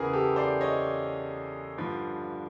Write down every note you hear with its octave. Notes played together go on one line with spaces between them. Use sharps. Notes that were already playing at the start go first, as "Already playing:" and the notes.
Already playing: E2 C#3 E3 G#4 A#4
G4 A4
C5 D5
C#5 D#5
G2 D3 F3